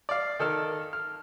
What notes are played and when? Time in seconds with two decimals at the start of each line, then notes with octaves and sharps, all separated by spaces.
0.09 D5 F5
0.40 D#3 A4 A5 F6
0.93 F6